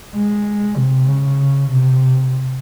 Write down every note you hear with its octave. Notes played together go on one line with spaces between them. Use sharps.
G#3
C3
C#3
C3